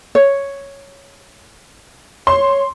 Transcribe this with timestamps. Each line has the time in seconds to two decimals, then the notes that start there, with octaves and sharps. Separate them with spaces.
0.15 C#5
2.27 C#5 C6